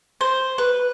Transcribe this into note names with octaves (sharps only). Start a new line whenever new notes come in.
C5
B4